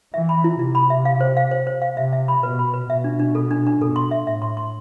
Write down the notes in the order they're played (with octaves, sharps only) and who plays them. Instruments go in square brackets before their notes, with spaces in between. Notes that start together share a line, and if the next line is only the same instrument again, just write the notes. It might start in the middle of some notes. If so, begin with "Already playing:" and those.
[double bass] E3 [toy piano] E5
[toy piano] B5
E4
[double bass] C3 [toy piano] E4
[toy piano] B5
E5
F5
C5
F5
C5
C5
F5
[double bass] C3 [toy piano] E5
[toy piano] E5
B5
[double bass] B2 [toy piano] B4
[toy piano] B5
B4
[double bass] B2 [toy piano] E5
[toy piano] D4
D4
A4
D4
D4
[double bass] B2 [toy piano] A4
[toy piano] C6
E5
[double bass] A2 [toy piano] E5
[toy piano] C6
C6